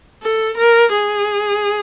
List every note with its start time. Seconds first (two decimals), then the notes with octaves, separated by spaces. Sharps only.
0.23 A4
0.57 A#4
0.92 G#4